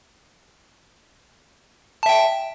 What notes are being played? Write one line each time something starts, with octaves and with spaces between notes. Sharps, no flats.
E5 G5 A5